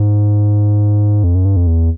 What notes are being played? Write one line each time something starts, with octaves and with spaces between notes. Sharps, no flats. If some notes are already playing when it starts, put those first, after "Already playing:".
Already playing: G#2
F2
F#2
G2
F2
E2